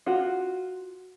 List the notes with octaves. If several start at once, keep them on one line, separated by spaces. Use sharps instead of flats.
F4 F#4